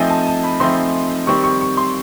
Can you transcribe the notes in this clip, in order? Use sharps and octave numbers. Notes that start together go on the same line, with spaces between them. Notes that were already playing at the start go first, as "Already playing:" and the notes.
Already playing: F3 A3 C4 D#4 G#5
A5
A5
B5
F3 A3 C4 D#4 C6
D#3 G3 C4 C#6
C#6
C#6
C6